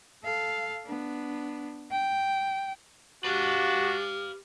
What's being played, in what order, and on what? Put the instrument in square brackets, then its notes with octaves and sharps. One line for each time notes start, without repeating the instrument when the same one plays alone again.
[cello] A4 F5
B3 D4
G5
[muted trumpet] D4 [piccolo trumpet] F#4 [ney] G4 [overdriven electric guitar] B4 F5